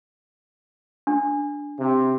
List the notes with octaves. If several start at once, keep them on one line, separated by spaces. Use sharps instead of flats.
D4
C3